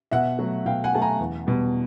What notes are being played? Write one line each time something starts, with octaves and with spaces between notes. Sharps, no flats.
B2 E5 F#5
F#3 A3
B2 F5 G5
F#5 G#5
F#3 A3 A5
G#5 A#5
E2
B2 G3